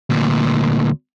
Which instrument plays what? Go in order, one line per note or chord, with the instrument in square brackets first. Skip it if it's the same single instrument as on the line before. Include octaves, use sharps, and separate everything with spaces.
[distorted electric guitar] D2 A#2